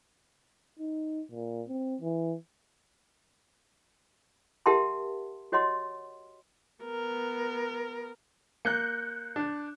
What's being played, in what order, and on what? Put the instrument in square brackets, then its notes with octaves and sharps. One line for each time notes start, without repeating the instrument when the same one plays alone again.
[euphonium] D#4
A#2
C4
E3
[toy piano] G4 A#4 E5 F#5 A5 C6
F#4 C#5 D#5 F#5 C6
[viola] B3 A#4
[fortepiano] A#3 [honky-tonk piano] F#6 G6 C#7
[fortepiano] D4